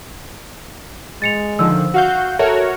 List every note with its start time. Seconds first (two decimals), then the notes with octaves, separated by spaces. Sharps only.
1.22 G#3 A6 C#7 F7
1.59 D3 D#3 F3 E6
1.94 F#4 F5 F#5 G6
2.39 F#4 A4 A#4 C#5 E5